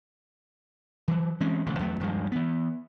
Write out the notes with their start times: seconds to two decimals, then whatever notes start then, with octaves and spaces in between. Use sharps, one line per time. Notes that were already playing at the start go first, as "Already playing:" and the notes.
1.08 E3 F#3
1.40 E3 G#3 C4 C#4
1.66 E1 A1 D3 A3
1.79 E2 F#3 A3
2.00 D#1 G2 F3 G#3
2.32 E3 B3